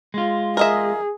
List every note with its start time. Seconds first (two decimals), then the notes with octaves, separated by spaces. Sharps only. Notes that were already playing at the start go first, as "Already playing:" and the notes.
0.14 G#3 F4
0.57 G#4 A#4 D#5 E5